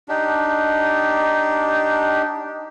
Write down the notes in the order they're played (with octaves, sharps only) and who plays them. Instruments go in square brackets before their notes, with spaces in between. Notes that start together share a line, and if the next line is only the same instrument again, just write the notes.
[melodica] D4 D#4 G4